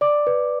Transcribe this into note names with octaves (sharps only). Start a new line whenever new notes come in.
D5 D6
B4